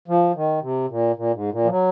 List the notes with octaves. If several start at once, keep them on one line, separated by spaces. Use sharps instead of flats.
F3
D#3
C3
A#2
A#2
G#2
A#2
F3
F#3